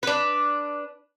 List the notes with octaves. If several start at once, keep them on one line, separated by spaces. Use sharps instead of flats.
D4 B4